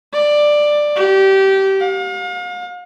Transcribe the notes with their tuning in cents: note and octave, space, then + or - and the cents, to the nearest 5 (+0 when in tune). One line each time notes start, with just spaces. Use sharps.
D5 +10
G4 -20
F5 +40